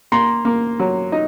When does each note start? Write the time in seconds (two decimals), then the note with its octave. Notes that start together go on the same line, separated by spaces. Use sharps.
0.12 A#3 A#5 C6
0.45 A#3
0.80 F#3
1.12 D#4